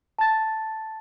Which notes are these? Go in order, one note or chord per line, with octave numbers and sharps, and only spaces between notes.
A5 A6